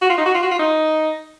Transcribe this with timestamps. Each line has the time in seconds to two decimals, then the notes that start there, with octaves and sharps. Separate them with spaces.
0.02 F#4
0.10 F4
0.18 D#4
0.26 F#4
0.34 F4
0.43 F#4
0.51 F4
0.59 D#4